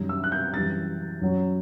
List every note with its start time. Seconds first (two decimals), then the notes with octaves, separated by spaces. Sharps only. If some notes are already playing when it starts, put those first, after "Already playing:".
Already playing: F#2 D#3 G3
0.09 E6
0.24 F#6
0.32 G6
0.53 F#2 E3 G3 A6
1.22 F#2 F#3